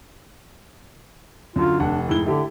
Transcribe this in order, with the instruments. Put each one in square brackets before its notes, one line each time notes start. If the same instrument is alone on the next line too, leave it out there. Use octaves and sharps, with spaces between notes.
[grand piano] F#2 D3 [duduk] F4
[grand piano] F1 F#5 [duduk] D4
[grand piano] F1 G#2 G7 [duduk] E4
[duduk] D3 [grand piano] E4 G4 A4